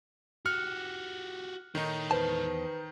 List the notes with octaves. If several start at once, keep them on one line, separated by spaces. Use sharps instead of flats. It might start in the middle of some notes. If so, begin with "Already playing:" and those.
F#4 G4 F6 F#6 C#7
D#3 D#4 A4 C#5
E2 B4 C5 A5